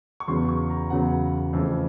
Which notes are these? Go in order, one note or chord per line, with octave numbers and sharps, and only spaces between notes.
C#6
E2 C#3 F#3 B3 C6
C#6
A#5
E2 C#3 F#3 B3 F#5
F2 C#3 E3 A3